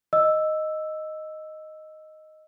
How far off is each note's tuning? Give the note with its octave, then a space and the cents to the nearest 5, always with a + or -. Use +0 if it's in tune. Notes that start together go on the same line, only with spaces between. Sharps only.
D#5 +0 E6 +0